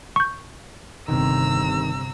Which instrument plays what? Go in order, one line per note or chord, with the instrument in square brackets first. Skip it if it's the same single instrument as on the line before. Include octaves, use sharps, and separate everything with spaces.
[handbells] C#6 G6
[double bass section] G1 C3 [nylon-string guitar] D#3 [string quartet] A#5 E6